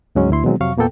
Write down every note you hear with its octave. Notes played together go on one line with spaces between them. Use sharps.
D2 G#2 F#3 G#3 C#4
D2 E4 C6
B2 D#3 E3 F#3 G#3 C4
F2 C3 F#3 F5 C#6
E2 A#2 A#3 B3 A4 G5